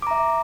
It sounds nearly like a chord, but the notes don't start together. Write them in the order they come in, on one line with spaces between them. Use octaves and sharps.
D6 A#5 E5